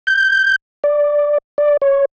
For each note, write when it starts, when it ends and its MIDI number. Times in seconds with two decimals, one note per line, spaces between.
0.07 0.56 91
0.84 1.38 74
1.58 1.77 74
1.82 2.05 73